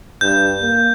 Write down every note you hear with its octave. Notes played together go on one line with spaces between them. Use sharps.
G2 G6
A#3